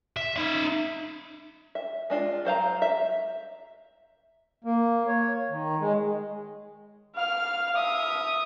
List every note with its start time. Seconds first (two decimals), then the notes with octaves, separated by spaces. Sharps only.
0.17 E5
0.36 D#4 E5
1.75 E5
2.10 G#3 D4 F4
2.45 F#3 C5 F5 A#5
2.82 E5
4.64 A#3
5.07 C#5
5.50 D#3
5.80 G#3
7.15 F5 F6
7.75 E5 D#6